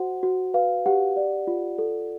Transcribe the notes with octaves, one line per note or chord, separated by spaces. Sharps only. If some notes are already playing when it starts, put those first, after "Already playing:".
Already playing: F#4 C5 F#5
F#4
B4 F5
G4 F#5
D5
F4
A4